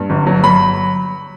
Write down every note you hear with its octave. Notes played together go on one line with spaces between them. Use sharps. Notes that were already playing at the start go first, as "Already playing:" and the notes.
Already playing: G2
G1
F#3
F#3 B5